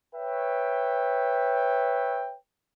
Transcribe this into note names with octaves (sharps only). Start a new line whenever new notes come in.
B4 C#5 E5 G5